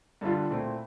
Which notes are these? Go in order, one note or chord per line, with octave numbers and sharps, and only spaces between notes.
G2 D3 G3 D4 F4
A#2 A3 C4 E4